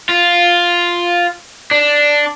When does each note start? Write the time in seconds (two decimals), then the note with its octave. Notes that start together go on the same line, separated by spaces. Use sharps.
0.09 F4
1.71 D4